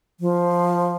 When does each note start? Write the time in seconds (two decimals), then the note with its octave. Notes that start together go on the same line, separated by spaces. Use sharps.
0.20 F3